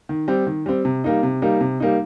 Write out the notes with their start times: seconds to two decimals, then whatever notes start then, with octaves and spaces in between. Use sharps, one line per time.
0.09 D#3
0.28 G3 C4
0.47 D#3
0.66 G3 C4
0.85 C3
1.04 G3 A#3 D#4
1.23 C3
1.42 G3 A#3 D#4
1.61 C3
1.80 G3 A#3 D#4